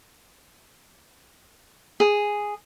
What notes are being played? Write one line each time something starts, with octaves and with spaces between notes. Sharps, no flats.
G#4